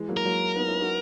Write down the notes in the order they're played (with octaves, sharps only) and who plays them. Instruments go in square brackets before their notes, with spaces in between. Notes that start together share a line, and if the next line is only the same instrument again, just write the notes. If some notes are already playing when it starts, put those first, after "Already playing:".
Already playing: [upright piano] E3 G#3
F#3 A#3
[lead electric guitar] A#4
[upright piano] F#3 A#3
B3 D#4
C#4 E4
D#4 F#4